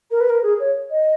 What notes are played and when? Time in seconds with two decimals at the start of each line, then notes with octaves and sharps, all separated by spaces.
0.10 A#4
0.20 B4
0.29 A#4
0.42 G#4
0.59 C#5
0.91 D#5